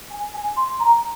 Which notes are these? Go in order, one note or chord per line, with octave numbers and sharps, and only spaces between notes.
G#5
G#5
C6
A#5